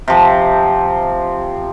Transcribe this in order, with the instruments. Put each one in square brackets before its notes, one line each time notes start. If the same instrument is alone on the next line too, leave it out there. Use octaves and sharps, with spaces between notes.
[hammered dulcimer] C3 F3